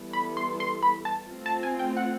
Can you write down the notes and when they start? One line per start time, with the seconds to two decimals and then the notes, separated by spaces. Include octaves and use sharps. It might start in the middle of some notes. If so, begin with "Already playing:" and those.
Already playing: E3 G3 B3 E4 A4
0.13 B5
0.37 C6
0.60 C6
0.83 B5
1.05 A5
1.28 A3 C4 F4
1.46 A5
1.63 G#5
1.79 G5
1.97 F#5